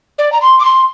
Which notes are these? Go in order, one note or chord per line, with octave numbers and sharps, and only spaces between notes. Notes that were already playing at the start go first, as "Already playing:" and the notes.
D5
A#5
C6
D6
C6